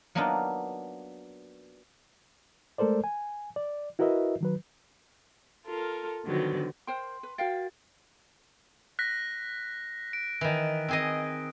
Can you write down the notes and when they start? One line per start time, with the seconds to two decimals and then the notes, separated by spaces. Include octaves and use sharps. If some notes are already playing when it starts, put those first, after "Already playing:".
0.15 F#3 A#3 B3 D4 D#4 F4
2.78 G#3 A3 A4 A#4 C5 D5
3.04 G#5
3.56 D5
3.99 E4 F#4 A#4 B4 D#5 E5
4.41 D#3 F#3 B4
5.66 F4 A4 A#4
6.24 D3 D#3 F3 F#3 B3
6.87 A#4 C5 G5 C6
7.23 B4
7.38 F#4 A#4 F5 G5 A6
8.99 F#6 A#6 B6
10.13 D7
10.41 D#3 E3
10.88 C4 G#4 D#5